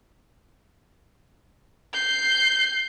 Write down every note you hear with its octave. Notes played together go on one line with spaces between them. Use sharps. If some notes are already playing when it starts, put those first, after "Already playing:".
G6 C7